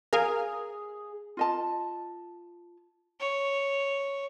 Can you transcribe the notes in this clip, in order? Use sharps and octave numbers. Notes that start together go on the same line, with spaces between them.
G#4 A#4 F5 G#5
F4 D#5 A5
C#5